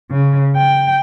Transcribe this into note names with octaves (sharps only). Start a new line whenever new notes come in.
C#3
G5